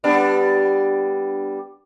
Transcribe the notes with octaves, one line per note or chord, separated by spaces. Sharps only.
G3 B3 D4